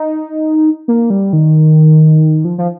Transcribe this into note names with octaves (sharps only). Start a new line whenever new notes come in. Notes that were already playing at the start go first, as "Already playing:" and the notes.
Already playing: D#4
A#3
G3
D#3
F3
F3